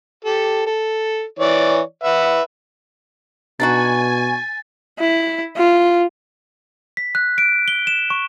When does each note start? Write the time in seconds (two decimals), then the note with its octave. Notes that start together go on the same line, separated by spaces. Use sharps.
0.25 G4 A4
0.66 A4
1.39 E3 C#5 D5
2.04 B4 E5 F#5
3.60 B2 D4 D#4 F#4 G#5 A6
4.99 E4
5.57 F4
6.97 B6
7.15 F#6
7.38 D7
7.68 G7
7.87 E7
8.10 C#6